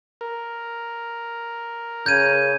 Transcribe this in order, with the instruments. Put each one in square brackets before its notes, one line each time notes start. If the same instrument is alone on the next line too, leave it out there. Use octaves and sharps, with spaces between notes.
[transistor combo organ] A#4
[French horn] C#3 [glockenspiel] G6 G#6 D#7